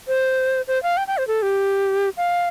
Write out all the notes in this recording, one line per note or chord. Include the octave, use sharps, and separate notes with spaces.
C5
C5
F5
G5
G5
C5
A4
G4
F5